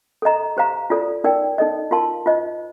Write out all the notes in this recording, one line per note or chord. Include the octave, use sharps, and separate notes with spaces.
A4 D#5 A#5
G4 C5 F5 A#5
F4 A4 D5
D#4 A#4 D5 G5
D#4 A4 D#5
F4 A#4 F5 A5 C6
F4 C5 D#5